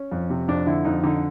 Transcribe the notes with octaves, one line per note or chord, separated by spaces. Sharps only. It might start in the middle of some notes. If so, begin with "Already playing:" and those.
Already playing: C#4
F2
C3
F2 D4
D3 E4
F2 D#4
D3 D#4